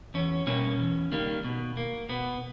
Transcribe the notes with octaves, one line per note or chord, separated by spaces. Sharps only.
E2 C#4
B2 G3 A#3 C#4
E2
D#3 G3 A#3
B2
A#3
B2 B3